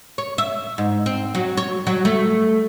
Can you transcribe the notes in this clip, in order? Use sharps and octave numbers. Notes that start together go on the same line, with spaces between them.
C#5
E5
G#2
C4
F#3
C#5
F#3
A3